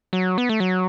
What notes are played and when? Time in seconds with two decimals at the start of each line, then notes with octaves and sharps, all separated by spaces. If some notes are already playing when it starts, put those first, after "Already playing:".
0.13 F#3
0.38 B3
0.49 A3
0.60 F#3